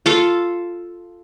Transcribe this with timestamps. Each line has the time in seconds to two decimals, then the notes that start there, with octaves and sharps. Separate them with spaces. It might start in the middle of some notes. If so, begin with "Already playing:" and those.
0.06 F4 A4 F5